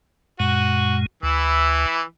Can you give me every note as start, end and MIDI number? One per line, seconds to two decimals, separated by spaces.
0.40 1.06 42
0.40 1.06 46
0.40 1.06 56
0.40 0.97 66
1.23 1.86 38
1.23 2.02 52
1.23 2.02 64